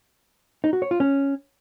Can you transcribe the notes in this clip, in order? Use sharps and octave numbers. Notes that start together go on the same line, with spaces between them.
D#4
F#4
C#5
F4
C#4